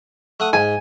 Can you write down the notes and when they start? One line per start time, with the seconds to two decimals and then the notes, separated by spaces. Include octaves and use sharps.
0.40 A3 F#5 D#6
0.53 G#2 G#5